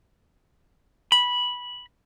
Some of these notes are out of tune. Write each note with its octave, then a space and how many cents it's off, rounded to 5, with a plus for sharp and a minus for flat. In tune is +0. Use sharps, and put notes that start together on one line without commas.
B5 -10